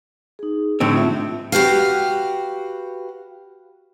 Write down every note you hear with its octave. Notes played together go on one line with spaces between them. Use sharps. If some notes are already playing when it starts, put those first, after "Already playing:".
D#4 G#4
A2 D3 C4
F4 E5
F#4 G4 B4 F5